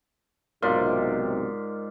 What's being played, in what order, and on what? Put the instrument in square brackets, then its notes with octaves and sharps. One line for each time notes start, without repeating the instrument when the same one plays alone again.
[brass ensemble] B1 C3 [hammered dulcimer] G#2 F4 D5 [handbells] A#4